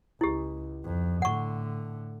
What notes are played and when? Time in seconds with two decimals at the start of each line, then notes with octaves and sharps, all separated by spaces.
0.21 C#2 E4 G4
0.84 F2
1.22 A2 D3 F#5 C#6